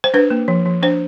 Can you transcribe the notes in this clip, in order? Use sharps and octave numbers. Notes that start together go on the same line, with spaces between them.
C5
D4 B4
A#3
F3
F3
D4 C5